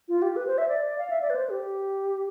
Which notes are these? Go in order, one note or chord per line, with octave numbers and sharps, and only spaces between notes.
F4
G4
B4
C5
E5
D5
F5
E5
D5
B4
C5
G4